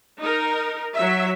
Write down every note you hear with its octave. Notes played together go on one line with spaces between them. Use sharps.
D#4 A#4
F#3 E5